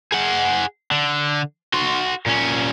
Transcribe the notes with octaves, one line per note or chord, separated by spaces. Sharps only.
G#4 F#5
D3
F#4 C6
A#2 C#4